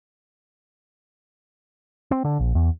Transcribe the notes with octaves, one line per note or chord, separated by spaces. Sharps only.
C4
D3
A#1
E2